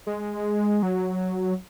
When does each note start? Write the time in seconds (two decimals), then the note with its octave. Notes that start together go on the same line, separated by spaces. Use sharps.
0.07 G#3
0.83 F#3